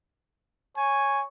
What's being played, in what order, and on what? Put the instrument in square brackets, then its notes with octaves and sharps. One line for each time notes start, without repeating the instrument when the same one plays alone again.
[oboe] C#5 [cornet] G#5